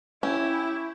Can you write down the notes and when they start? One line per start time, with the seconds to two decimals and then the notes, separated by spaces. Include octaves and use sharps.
0.23 C#4 E4 G4 E5 G5